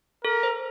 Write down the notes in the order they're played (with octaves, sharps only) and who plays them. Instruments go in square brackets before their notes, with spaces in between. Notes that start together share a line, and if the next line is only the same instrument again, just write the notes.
[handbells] A4 [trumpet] A#4
[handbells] C5